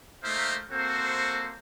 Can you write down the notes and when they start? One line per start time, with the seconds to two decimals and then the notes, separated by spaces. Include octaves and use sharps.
0.23 A3 A#3 D#4 C5 E5 F5
0.71 A#3 C4 F#4 A4 C5